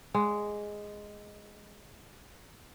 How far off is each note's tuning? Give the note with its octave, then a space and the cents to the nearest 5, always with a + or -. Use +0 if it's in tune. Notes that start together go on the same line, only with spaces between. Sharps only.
G#3 +0 D5 -25 F#5 +0